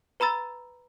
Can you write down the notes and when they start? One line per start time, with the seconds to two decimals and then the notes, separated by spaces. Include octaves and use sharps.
0.20 B4 A#5 B5 E6 A6